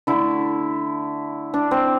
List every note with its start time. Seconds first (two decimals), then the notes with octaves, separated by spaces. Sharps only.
0.07 D3 A3 E4
1.54 D4
1.71 C4